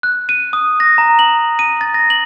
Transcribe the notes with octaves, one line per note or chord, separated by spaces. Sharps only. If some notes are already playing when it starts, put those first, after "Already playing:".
F#6
D#7
D#6
A#6
A#5
F#7
D#7
A6
A#6
F#7